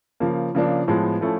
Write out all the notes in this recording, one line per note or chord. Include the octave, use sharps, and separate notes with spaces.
C#3 F3 A#3
C#3 F3 A#3 D4
A2 F3 G#3 B3
F3 A3 C#4 E4